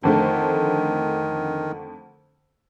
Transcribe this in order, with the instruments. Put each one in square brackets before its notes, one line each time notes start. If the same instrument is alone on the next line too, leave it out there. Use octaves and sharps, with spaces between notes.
[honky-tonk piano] F2 D3 A3 [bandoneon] D#3